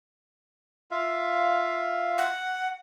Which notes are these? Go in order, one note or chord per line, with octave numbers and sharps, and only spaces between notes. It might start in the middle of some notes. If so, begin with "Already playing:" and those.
F4 E5 F5
F#5